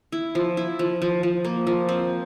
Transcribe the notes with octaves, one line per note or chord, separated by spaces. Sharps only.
E4
F3
E4
F3
F3
F3
A#3
F3
C4